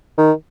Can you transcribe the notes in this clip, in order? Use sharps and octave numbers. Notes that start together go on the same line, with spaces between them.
D#3